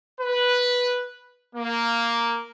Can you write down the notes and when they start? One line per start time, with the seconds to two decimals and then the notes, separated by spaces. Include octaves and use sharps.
0.21 B4
1.56 A#3